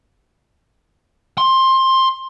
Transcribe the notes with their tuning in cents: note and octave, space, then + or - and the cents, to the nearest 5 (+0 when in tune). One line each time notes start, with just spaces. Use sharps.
C6 +15